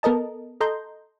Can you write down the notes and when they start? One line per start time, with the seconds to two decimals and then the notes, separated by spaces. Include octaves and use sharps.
0.03 B3 A4 A#4 D#5 A5
0.61 A4 D#5 A#5 C6 G6